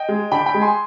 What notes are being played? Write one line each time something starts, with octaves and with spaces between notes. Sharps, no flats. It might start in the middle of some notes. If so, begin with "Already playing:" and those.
Already playing: D#5 G5
G#3
D3 G5 B5
G5 B5
G#3
G#5 C6